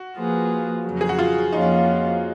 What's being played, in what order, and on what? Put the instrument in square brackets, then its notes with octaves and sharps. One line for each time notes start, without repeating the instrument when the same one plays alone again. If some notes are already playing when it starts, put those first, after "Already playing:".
Already playing: [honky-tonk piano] F#4
[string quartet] F3 A#3 F4 G#4 B4
F2 C#3 F#3
[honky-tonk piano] G#4
F#4
F4
[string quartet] F2 F3 A#3 C#4 F4 [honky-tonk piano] D#4